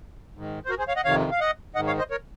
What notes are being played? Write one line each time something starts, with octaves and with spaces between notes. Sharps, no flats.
G#2 D#3
C5
F#4 A#4
G#4 C5
C#5 F5
D#5 F#5
F2 C3 D#3 C#5 F5
F5
D#5 F#5
G#2 D#3 D#5 F#5
C#5 F5
C5 D#5
A#4 C#5